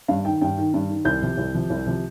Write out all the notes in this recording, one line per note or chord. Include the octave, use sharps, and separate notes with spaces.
G2 F5
D#3 G5
G2 G5
D#3
G2
D#3
C2 G6
C3 F3
C2
C3 F3
C2
C3 F3